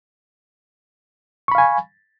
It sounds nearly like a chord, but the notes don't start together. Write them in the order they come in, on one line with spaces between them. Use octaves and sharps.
C#6 B5 F5 G#5